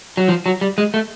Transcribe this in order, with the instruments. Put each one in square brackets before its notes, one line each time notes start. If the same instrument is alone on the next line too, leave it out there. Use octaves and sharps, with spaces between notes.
[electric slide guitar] F#3
F3
F#3
G3
G#3
A3